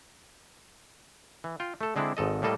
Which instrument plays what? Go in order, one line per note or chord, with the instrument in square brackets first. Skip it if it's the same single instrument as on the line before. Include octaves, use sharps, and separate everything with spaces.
[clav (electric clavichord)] E3
F4 G5
A3 A4
D3 G#3 C4 D4 E4
G#1 G#2 A4 D#5
A2 G3 A#3 A4 D#5